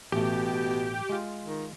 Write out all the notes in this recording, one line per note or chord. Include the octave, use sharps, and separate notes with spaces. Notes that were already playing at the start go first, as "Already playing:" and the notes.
A1 B2 A3 G4
G#3 F4
D#3